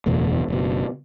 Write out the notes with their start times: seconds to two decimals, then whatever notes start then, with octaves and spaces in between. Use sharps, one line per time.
0.06 F#1 E2 B2 A3
0.48 F#1 B2